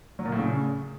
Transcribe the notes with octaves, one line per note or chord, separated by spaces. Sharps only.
F#3
A#2
A2
C#3